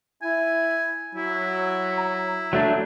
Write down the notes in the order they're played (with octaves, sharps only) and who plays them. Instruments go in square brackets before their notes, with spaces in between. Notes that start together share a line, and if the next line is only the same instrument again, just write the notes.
[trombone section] E4 [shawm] G#5
[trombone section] F#3 [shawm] E4
[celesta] A#5
[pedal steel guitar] F#3 A3 D4